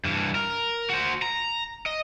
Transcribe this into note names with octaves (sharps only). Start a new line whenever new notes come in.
G2 E3
A#4
F#4 C5
A#5
D#5